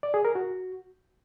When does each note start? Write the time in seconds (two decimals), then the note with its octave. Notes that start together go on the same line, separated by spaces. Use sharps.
0.03 D5
0.14 G#4
0.25 A#4
0.35 F#4